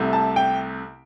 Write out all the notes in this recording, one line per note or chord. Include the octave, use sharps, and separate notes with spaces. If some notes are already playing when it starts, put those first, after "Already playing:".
Already playing: C2 C3 A3
A5
G5